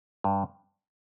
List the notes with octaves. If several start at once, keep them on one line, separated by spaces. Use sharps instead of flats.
G2